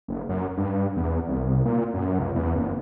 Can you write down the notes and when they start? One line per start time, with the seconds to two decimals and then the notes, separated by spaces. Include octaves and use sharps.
0.08 F#1
0.29 F#2
0.57 G2
0.96 E2
1.29 C2
1.65 A#2
1.94 F#2
2.19 C#2
2.35 E2
2.56 F#1